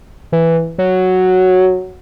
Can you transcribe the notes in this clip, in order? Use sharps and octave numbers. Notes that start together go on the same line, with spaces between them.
E3
F#3